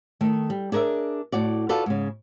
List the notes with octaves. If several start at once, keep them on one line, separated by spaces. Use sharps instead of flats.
D#3 A3
G3
D4 G#4 A#4 C#5 E5
A2 F#4 D5
F4 F#4 A4 B4 D5
G#2 C#3